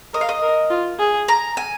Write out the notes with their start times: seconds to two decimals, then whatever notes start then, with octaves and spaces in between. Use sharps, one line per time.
0.14 A#4 D#5
0.21 F5
0.29 D#5
0.43 A#4
0.71 F4
1.00 G#4
1.28 A#5
1.57 G#5